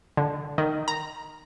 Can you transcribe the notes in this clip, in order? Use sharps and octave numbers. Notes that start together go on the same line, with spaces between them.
D3
D#3
A#5